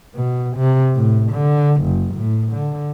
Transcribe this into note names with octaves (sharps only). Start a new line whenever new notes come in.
B2
C3
A2
D3
F#1
A2
D3